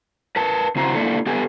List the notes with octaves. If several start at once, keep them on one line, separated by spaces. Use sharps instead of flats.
A#4 B4 A5
C#3 C4 E4 F#4 C5 A#5
A#3 D4 E4 F4 A4
B3 G4 A4 B4 G#5